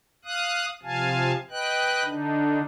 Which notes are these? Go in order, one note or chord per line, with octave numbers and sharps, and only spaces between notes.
F5 D#6 F#6
C3 F3 F5 G#5 A5
B4 D#5 G5 F#6
D3 D4 D#4